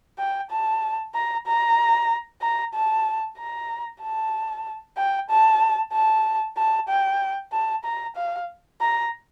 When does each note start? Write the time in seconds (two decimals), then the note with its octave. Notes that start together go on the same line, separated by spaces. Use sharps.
0.19 G5
0.51 A5
1.15 A#5
1.47 A#5
2.42 A#5
2.74 A5
3.38 A#5
4.02 A5
4.97 G5
5.30 A5
5.93 A5
6.57 A5
6.88 G5
7.53 A5
7.84 A#5
8.16 F5
8.81 A#5